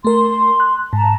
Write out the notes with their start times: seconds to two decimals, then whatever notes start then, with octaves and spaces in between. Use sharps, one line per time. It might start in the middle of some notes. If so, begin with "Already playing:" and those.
0.05 A3 A#4 C6
0.60 F#6
0.93 G#2 A5 A#5